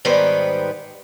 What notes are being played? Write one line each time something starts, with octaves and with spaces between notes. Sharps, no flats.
G#2 D#3 G3 B3 B4 C5